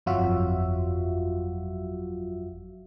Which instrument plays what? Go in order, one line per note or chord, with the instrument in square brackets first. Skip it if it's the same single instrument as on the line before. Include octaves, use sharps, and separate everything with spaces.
[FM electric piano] G1 F2 F#3 F4 F#4 E5